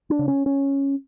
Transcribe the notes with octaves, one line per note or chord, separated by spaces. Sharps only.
D4
C#3
C#4
C#4